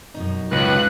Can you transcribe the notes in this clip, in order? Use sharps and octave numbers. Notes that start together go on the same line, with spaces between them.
F#2 B2 D#4
C#2 B4 F#6